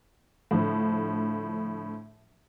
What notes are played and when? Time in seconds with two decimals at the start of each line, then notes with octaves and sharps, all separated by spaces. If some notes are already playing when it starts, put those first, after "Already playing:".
0.51 A2 D3 F3